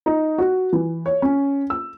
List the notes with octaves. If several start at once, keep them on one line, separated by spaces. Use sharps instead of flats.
D#4
F#4
E3
C#5
C#4
E6